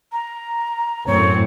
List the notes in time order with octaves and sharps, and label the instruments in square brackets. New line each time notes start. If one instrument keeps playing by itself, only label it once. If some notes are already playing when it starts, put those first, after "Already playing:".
[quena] A#5
[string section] F#2 A2 C4 [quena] C#5